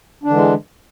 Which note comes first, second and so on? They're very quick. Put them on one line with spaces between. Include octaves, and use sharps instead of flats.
D4 D3 E3 G#3